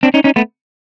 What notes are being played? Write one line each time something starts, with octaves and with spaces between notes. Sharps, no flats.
C4 D4
C#4 D#4
C#4 D#4
A3 B3